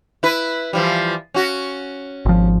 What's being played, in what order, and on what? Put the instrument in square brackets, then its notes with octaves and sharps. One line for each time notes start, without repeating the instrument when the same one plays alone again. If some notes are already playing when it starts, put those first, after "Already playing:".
[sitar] E4 B4
E3 F3 G3
C#4 F#4
[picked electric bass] G#1 F3